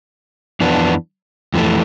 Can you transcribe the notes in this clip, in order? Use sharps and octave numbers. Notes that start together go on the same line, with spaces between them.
F2 E3 B3 D4
F2 E3 A3